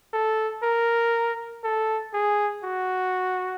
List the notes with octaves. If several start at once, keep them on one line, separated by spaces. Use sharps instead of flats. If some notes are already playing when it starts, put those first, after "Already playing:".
A4
A#4
A4
G#4
F#4